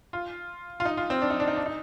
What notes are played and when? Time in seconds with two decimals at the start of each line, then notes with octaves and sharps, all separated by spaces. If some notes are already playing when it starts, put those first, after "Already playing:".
0.13 F4
0.80 F4
0.85 D#4
0.97 F4
1.10 C4
1.22 D4
1.30 D#4
1.40 D4
1.48 D#4
1.56 D4
1.66 D#4